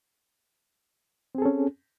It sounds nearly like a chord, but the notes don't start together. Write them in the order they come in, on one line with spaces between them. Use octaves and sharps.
C4 G#4 A4 C#4